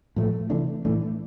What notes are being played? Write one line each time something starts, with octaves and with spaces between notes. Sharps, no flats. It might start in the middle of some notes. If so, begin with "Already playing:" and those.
A2 F3 A3
C3 E3 A3 D4
A2 E3 A3 D4